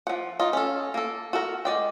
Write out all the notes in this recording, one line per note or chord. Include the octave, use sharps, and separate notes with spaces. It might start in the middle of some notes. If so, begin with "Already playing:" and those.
F3 F#5
D#4 F4
C#4 A4
A#3 A4
F#4 A4 A#4
G#3 D5 G5